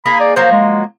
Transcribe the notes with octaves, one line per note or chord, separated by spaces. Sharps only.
A#3 D#4 G#4 B5
D5
F3 F#3 A#3 C5
G#3